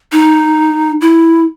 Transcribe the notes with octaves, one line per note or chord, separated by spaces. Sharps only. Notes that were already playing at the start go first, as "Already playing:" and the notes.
D#4
E4